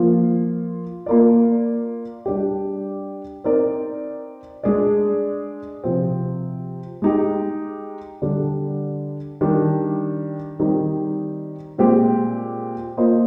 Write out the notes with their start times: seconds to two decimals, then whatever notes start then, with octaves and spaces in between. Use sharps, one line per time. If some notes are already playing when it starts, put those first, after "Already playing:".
Already playing: F3 A#3 F4
1.06 A#3 F4 A#4 D5
2.26 G3 D4 G4
3.44 C4 D#4 A#4 D5
4.63 G#3 D4 G#4 D5
5.84 C3 F3 C4
7.02 G#3 D#4 G4
8.22 D3 G3 D4
9.41 D#3 G3 D4
10.60 D#3 G3 C4 D#4
11.78 A#2 G#3 C4 G4
12.97 A#3 F4 C5 D#5